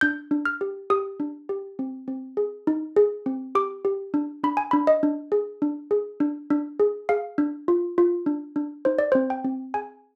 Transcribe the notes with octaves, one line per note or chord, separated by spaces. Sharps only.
D4 G6
D4
F6
G4
G4 D#6
D4
G4
C4
C4
G#4
D#4
G#4
C4
G4 D6
G4
D4
D4 B5
G#5
D4 B5
D#5
D4
G#4
D4
G#4
D4
D4
G#4
G#4 F5
D4
F4
F4
D4
D4
D#4 C5
D5
C4 C5
G5
C4
G#4 G#5